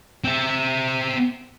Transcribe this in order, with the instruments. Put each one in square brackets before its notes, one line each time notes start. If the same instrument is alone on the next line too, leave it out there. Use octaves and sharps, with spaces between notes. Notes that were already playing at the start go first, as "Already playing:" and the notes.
[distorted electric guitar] C4 E5